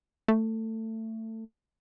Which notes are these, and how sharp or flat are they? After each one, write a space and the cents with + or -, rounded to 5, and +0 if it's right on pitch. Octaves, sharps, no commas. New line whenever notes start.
A3 +20